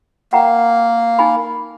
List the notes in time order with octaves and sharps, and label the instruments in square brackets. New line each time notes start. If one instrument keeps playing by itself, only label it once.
[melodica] A#3 [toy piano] F#5 G5 A#5
[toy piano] D#4 G#5 B5